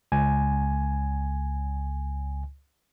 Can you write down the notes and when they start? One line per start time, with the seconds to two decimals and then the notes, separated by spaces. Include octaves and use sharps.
0.12 C#2 G#5